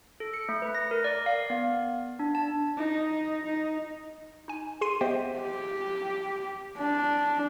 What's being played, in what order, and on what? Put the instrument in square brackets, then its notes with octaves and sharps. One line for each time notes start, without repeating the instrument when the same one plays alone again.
[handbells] A4
C#7
A3
B4
A#6
A#4
D5
F5
B3
D4
A5
[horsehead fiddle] D#4
D#4
[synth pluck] D#4 G#5
G#4 C6 C7 D#7
B3 G4 C5 D#5 E5 G5
[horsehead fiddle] G4
D4